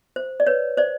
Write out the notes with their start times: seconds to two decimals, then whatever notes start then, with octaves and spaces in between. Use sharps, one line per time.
0.16 C5
0.40 D5
0.47 B4 C#5
0.77 C5 D5